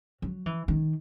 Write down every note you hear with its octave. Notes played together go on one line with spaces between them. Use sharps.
F#3
E3
D#3